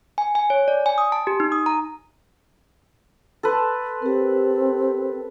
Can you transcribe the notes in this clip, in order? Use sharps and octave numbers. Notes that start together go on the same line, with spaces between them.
G#5
G#5
C#5
D5
G#5
D#6
A5
G4
D#4
D#6
A#5
A4 B4 A5 C6
C4 G4 A#4